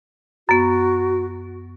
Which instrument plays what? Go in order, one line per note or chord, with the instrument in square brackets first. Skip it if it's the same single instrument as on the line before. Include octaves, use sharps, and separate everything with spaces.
[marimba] F#2 B3 [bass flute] F#4